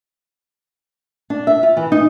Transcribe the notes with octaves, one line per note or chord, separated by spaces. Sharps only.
D4
E5
F4
E3
D#4